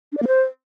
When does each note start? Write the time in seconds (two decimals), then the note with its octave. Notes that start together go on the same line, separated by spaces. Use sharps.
0.12 D4
0.17 D5
0.22 A#3
0.27 C5